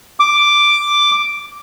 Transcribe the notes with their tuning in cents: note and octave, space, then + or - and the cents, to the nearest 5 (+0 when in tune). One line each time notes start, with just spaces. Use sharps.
D6 +0